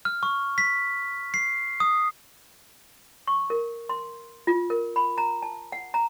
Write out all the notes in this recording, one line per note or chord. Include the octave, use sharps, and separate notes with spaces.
F6
C#6
B6
C7
D#6
C#6
A#4
C6
F4
A#4
B5
A#5
A5
F#5
A#5